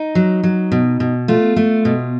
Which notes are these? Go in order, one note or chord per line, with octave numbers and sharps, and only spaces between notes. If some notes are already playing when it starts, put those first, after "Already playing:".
Already playing: D#4
F#3
F#3
B2
B2
A3 F4
A3
B2